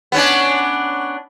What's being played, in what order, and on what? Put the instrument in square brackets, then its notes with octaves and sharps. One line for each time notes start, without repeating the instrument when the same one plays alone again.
[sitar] B3 C#4 D4